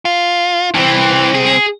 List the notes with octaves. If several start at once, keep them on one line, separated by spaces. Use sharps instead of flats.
F4
C2 E3 C4
G#4